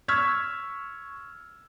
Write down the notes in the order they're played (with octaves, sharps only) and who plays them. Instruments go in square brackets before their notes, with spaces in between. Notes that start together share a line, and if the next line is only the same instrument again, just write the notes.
[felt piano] C#6 E6 F6 G#6 B6